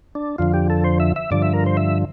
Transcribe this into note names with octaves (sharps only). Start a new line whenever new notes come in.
D4
F2 D3 F3 F4
G4
A4
C5
E5
E5
G2 D3 F3 D5
E5
A#4
C5
E5